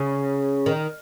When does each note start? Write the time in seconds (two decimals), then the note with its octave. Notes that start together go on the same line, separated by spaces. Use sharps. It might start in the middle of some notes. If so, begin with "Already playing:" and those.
Already playing: C#3
0.66 D#3